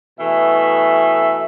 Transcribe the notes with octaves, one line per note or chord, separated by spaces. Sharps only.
B2 E3 A3 E5